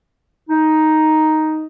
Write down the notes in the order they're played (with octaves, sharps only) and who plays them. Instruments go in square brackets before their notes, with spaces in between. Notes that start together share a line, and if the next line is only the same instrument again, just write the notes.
[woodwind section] D#4